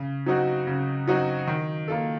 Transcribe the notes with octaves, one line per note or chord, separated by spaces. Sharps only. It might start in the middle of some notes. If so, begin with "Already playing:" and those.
Already playing: C#3
F#3 C4 D#4 F#4
C#3
F#3 C4 D#4 F#4
D#3
A#3 F4 A4